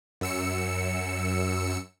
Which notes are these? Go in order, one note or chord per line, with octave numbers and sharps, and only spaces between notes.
F#2 E6 C#7